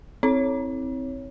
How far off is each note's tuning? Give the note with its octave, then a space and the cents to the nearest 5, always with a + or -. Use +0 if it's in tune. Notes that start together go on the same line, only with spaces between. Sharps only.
C4 +0 E4 -45 C#5 +0